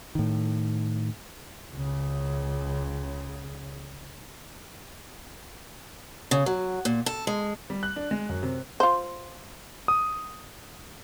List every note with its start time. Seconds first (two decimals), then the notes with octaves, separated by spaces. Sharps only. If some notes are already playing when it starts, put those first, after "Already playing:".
0.15 A2 D#3
1.73 C#2 C#3
6.31 C#3
6.46 F#3
6.85 A#2
7.06 A4
7.27 G#3
7.70 G3
7.83 F#6
7.96 D4
8.11 G#3
8.29 F#2
8.43 C3
8.80 F4 C5
9.88 D#6